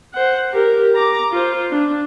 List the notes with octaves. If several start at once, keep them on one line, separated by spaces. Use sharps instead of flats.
C5 F#5
G4 A#4
A#5 D6
F4 C5
D4